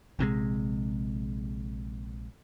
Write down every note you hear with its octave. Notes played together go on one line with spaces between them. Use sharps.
A#1 C3 E3 G#3